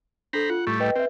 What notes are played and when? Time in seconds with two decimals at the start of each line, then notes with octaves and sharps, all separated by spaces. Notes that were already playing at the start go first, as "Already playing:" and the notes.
0.33 D4 A4 C5 A#5 B5
0.50 F4 F#5
0.67 A2 G3 A3 C#6
0.80 B4 D#5 G5
0.96 C4 B4 E5